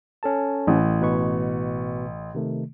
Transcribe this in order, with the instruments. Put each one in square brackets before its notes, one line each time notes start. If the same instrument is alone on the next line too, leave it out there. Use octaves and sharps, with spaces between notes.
[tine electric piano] C#4 A4 A5
[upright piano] A1
[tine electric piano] B2 B4 C#6
C3 D#3 A3